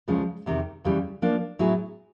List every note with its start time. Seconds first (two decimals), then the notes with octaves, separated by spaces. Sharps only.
0.08 D2 C#3 F3 G#3 C#4
0.46 E2 C3 D#3
0.84 D#2 C#3 E3 G3
1.22 F3 A#3 D4
1.59 A2 F#3 B3 E4 G#4